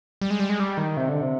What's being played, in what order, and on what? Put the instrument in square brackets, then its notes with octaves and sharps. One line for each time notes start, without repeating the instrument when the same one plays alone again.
[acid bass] G3
G#3
G3
G#3
G3
D#3
C3
D3
C3